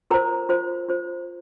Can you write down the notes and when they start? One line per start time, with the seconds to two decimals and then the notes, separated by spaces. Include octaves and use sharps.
0.10 F4 A#4 C5 A#5
0.49 F4 C5
0.89 F4 C5